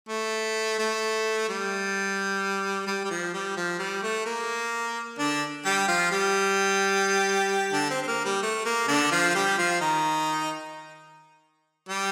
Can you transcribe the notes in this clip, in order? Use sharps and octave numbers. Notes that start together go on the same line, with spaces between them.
A3
A3
G3
G3
G3
F3
G3
F3
G3
A3
A#3
D3 D4
G3 G4
F3 F4
G3 G4
D3 D4
C4
C4
A#3
G3
A3
A#3
D3 D4
F3 F4
F4
G3 G4
F3 F4
D#3 D#4
G3 G4